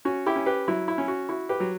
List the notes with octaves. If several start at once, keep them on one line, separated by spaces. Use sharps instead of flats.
C#4 F#4
E4 G4
C#4
G4 B4
F#3 E4
E4
C#4
F#4
E4 F#4
G4 B4
F#3